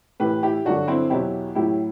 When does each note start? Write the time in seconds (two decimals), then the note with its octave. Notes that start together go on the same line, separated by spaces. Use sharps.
0.20 A2 E3 G4 B4
0.43 E4 G4
0.65 G2 D3 F#3 D4 F#4
0.88 C4 E4
1.10 E2 B2 F#3 E4 G4
1.55 A2 F#3 E4 G4